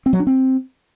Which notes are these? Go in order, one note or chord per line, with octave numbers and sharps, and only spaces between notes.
C4
F#3
D4
C4